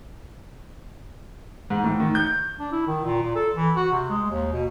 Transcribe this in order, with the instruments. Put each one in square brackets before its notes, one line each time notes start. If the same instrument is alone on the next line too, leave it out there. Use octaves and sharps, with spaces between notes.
[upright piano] G#2
A2
D#3
G6
[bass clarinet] D4
E4
D#3
A#2
A#2
A4
E3
F#4
C3
G#3
D#2
B2